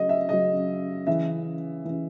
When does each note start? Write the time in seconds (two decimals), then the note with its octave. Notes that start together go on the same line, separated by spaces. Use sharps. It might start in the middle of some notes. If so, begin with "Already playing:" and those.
Already playing: C#3 F#3 D#5
0.09 E5
0.29 C#3 F#3 D#5
1.07 C#3 E3 E5
1.85 C#3 E3